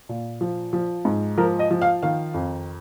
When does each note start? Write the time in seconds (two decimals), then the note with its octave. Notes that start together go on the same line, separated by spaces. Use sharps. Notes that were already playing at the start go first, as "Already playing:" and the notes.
0.09 A#2
0.41 F3
0.73 F3
1.05 G#2
1.38 F3 A#4
1.59 D#5
1.71 F3
1.82 F5
2.03 D#3 F5
2.34 F2